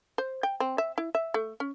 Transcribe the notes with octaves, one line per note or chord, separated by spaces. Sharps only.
C5
G5
C4
E5
E4
E5
A3
C#4